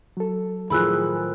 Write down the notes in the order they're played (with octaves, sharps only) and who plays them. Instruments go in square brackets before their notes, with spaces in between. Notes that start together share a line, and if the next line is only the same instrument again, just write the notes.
[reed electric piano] F#3 A4
[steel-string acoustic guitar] A2 D#3 F3 [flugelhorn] G#4 [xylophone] B5 E6 F#6